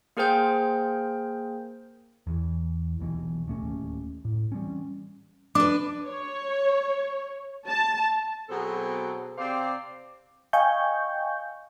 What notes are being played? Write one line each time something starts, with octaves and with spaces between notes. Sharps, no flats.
A#3 G#4 A#4 C5 G5 G6
E2 E3
D#1 B1 B2 E3
D1 D#2 A3 C#4
A2
E3 G3 C4 C#4
D4 B4 D6
C#5
A5
B2 F#3 B3 C4 G#4 A4
C3 C4 G4 C5 D5 F5
D#5 F5 G5 G#5 C#6 G6